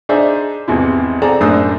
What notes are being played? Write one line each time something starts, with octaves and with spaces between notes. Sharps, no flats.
D4 D#4 G#4 C5 D5 E5
G#1 E2 C3 E4
C4 G#4 A4 D5 A#5
F#2 A2 D4 C5 D#6 E6